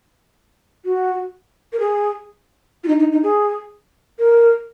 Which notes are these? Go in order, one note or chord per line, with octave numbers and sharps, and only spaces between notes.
F#4
A#4
G#4
F4
D#4
D#4
D#4
G#4
A#4